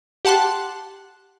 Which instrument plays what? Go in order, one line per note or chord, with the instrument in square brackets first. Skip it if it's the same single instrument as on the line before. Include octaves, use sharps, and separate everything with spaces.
[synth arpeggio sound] G4 F#5 A5 C6 F#6